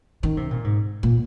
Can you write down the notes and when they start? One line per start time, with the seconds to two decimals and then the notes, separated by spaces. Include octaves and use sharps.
0.23 D#3
0.37 C3
0.51 A#2
0.64 G#2
1.03 A#2